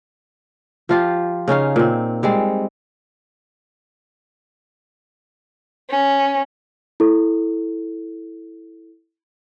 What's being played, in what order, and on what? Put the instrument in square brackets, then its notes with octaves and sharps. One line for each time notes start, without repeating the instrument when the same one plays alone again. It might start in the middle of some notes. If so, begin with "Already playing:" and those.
[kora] F3 F4 G4
C#3 C#4 D#4 F5
A#2 C4
G3 G#3 C4
[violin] C#4
[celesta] E4 A4